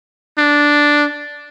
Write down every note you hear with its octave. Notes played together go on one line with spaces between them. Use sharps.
D4